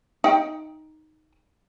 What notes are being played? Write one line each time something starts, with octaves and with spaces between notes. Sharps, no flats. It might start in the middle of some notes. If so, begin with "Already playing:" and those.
D#4 G5